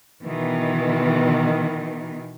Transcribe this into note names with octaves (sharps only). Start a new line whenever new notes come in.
B2 D#3 E3 B3